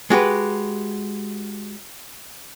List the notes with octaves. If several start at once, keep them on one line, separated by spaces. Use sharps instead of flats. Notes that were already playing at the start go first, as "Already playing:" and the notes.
G#3 F#4 G4 B4